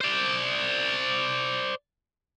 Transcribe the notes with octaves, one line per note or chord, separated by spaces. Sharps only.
C5 D5